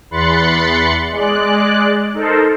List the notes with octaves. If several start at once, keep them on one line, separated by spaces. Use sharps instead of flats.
E2 B5 C6 F#6 A6 C#7
G#3 D5 F#6
D#4 A4 A#4 C5